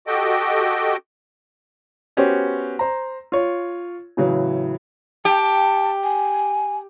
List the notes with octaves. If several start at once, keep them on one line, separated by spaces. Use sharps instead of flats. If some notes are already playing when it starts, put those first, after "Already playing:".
F#4 G4 A4 D#5 G5
B3 C#4 F#4 G4 C5
C5 A#5
F4 C#5
A2 C#3 E3 F#3
G4 A5
G#5